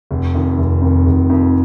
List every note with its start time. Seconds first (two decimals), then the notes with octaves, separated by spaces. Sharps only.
0.11 F1
0.35 F2 D#3
0.58 F1
0.81 F2 D#3
1.06 F1
1.30 F2 D#3